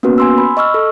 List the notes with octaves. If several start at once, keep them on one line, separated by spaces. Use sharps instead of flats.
A#3 B3 C#4 F#4 B4
G#5 C6 E6
B5
D#5 C#6 E6 F6
A4